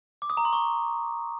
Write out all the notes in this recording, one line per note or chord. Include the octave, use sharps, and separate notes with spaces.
D6
D#6
A#5
C6
C#6